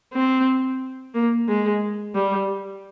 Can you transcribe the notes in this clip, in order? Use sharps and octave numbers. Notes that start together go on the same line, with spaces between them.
C4
A#3
G#3
G3